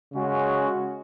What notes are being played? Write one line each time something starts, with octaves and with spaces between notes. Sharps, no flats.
C#3 G#3 C#4 F#4